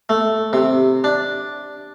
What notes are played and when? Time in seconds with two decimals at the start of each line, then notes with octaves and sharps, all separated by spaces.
0.09 A3
0.53 C3
1.04 D4